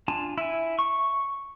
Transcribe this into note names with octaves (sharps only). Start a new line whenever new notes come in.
D4 F4 G#5 A5
E4 G#5
C#6